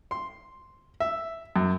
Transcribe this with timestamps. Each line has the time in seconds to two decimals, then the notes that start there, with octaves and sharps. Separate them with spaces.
0.11 C6
1.00 E5
1.56 F#2